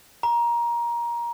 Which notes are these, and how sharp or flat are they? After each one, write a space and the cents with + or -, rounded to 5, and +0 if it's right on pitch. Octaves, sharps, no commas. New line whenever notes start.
A#5 +20